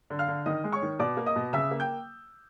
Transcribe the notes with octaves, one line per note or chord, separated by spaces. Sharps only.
D3
F5 F6
D3
D#3 D#5 D#6
G#3
C#5 C#6
D#3
B2 D5 D6
A#3
D#5 D#6
B2
C#3 E5 E6
A#3
G5 G6